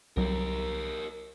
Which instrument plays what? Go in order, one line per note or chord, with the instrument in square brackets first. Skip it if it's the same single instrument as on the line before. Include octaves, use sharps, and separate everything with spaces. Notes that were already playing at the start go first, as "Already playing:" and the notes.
[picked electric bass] C2 F#3 [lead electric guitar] G4 A#4